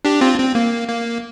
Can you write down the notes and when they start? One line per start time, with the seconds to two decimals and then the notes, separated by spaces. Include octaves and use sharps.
0.05 D4 G4
0.21 C4 F4
0.38 C4
0.55 A#3
0.88 A#3